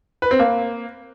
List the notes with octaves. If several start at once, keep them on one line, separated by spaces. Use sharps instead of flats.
B4
C4
A#3